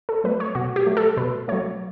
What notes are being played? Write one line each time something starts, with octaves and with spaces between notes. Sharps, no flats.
A4
F#3 A3 B4
C#5
B2 F#4
G4
F#3 A3
A4
B2 B4
F#3 A3 C#5